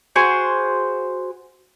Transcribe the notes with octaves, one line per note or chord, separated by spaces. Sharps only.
F#4 G#4 C5 C6